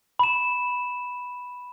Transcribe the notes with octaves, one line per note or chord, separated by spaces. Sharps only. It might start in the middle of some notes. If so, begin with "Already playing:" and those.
B5 E7